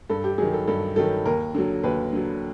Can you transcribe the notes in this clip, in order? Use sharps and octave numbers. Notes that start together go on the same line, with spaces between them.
G2 A4
G4
D#3 F#3 G#4
A4
G2 A4
D#3 F#3 A4
D#2 A#4
D3 F#3
D#2 B4
D3 F#3